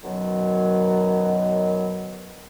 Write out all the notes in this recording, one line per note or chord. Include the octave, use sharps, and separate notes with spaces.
F#2 B2 D#3 F#3